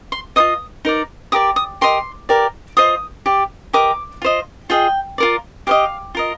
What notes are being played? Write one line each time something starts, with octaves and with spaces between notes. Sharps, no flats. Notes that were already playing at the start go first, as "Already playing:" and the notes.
C6
F4 C5 D#5 D#6
D#4 A#4 D5
G4 A#4 D5 D#6
D#6
G4 A#4 D#5 C6
G4 A#4 D5
F4 C5 D#5 D#6
G4 D5
G4 A#4 D#5 D6
F4 C5 D#5
F4 G#4 D#5 G5
F4 A#4 D5
G4 C5 D#5 F5
F4 A#4 D#5